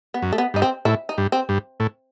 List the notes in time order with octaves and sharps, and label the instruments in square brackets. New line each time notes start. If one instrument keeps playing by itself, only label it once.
[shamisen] B3
[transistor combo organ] F#2
[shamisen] A3
B3
[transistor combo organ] G2 [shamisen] D#4
[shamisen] C4
[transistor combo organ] A2 [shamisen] E4
[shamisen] D#4
[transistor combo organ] G2
[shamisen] C4
[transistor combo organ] G2
A2